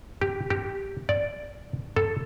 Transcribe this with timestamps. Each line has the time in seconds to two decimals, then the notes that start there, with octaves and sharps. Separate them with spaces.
0.21 G4
0.50 G4
1.09 D5
1.96 A4